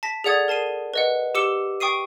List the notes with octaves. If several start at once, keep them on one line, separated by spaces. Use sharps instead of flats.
A5 A#6 B6
G#4 A4 D5 F#5 D#6 G#6
A#4 A5 C7 D#7
B4 D#5 F#5
G4 D6 E6 C#7 E7 G7
G5 C#6 D#6 C7 D#7